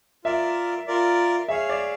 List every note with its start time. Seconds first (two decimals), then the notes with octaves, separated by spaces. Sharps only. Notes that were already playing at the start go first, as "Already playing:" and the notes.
0.24 F4 A#4 D5 E5
0.87 F4 A#4 D5
1.48 G#4 C#5 E5 F5
1.69 D5